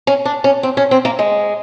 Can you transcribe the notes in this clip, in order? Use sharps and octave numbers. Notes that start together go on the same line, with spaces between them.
C#4
D4
C#4
C4
C#4
C4
A#3
G#3